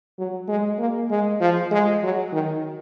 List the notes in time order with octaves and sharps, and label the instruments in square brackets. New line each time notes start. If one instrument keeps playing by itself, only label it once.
[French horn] F#3
G#3
A#3
G#3
F3
G#3
F#3
D#3